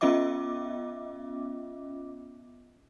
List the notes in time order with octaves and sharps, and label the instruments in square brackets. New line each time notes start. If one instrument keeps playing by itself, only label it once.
[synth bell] B3 C#4 F4 D#5 E5 D6